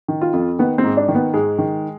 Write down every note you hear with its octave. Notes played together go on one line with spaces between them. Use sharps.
D#3
F4
F2
D#3 B3
C4
G#2
D4
D#3
B3
G#2 G#3
D#3